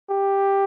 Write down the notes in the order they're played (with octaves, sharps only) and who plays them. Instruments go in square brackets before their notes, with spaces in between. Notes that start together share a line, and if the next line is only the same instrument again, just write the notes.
[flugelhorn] G4